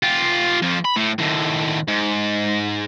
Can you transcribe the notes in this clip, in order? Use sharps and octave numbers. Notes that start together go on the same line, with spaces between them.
F4 G4
F2 F3
B5
A2
D#2 A2
G#2